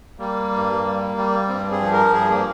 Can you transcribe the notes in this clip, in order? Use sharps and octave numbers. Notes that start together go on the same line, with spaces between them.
G3 A#3
G2
G3
G3
G2 C4
G#4
F3
A#4
G2 G#4
A#3